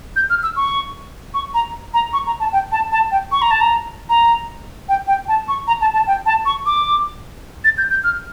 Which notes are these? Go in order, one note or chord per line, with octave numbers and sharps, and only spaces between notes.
G6
F6
E6
C#6
C#6
A#5
A#5
C#6
A#5
A5
G5
A5
A5
G5
C#6
A#5
A5
A#5
A#5
G5
G5
A5
C#6
A#5
A5
A5
G5
A5
C#6
D6
A6
G6
G6
F6